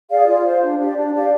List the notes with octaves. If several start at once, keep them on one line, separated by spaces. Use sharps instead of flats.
G#4 D5 F5
F4
C5 F5
D4
G4 D5
D4
G4 D5 F5